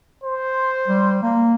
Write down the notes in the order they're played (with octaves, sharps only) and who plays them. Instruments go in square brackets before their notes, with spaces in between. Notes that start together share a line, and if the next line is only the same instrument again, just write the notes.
[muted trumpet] C5
[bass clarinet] G3
A#3